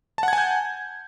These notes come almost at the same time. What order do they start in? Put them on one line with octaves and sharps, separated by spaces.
A5 F#5 G#6 G#5 G6